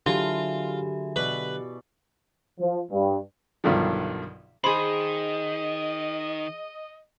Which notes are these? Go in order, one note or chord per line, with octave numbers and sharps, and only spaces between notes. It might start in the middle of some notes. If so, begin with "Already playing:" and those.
D3 F#3 E4 F4 G4 G#4 A5
B2 B4 D5 B5
F3
G2
B1 G2 B2 D3 D#3 F3
D#3 G#4 C5 D#5 B5